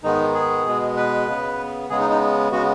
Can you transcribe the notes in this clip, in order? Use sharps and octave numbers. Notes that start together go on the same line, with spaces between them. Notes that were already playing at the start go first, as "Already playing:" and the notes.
G#2 D#3 G#3 B3 D#4
G#4
B2 G#3 B3
B4
C#3 B3
C#3 G#3 B3 G#4
D#4
D#4
C#3 G#3 B3 F#4